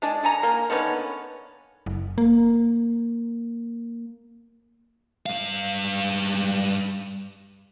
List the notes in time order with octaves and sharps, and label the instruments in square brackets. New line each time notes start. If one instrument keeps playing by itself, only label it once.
[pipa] G#3 D4 G#4
D3 G#5 A#5
A#3
D3 D#3 B3 C#4
[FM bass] F#1
A#3
[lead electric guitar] G2 F5